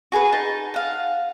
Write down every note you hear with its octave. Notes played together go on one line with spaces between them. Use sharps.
F#4 G#4 A#4 B4
D#4 A5
F5 F#5